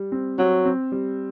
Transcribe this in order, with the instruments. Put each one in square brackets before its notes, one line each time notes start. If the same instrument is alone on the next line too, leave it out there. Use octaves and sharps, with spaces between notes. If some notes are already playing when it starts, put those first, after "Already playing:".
Already playing: [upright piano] G3
C4
[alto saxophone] F#3 [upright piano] C4
[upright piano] C4
G3